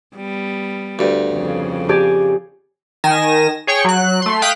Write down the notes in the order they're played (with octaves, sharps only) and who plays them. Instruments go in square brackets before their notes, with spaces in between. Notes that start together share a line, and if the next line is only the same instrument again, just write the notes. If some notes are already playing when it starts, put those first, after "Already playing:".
[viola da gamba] G3 B3
[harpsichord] D2 G2
[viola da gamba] F2 C#3
[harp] G4 D5 G#5
[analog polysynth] D#3 G#5 A#6 E7
G#4 C#5 G5 C#6
F#3 F#6
A3 C6
F5 G5 D#6 F#6 B6